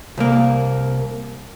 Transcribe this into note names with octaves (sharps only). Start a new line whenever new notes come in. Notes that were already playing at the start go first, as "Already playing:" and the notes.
C2 A#3